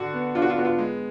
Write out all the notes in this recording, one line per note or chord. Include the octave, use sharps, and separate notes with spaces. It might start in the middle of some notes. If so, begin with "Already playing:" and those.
Already playing: D3 D4 F#4
B3
D4 F4
F#4
F4
B3 F#4
F4
G#3